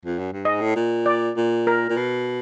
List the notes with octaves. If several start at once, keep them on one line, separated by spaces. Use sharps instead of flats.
F2
F#2
G2
G#2 D#5
A2
A#2
D5
A#2
A#4
A#2
B2